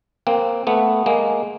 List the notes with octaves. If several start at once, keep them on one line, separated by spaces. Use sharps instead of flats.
A#3 C4
A3 B3
G#3 A#3